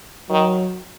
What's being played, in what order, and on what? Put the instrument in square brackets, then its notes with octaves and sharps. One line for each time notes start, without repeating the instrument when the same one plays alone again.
[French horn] D#3 [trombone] F#3